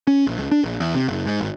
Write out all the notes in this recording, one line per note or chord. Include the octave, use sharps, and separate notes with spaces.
C#4
A#1
C#2
D4
A#1
E2
C3
F#1
G#2
G#1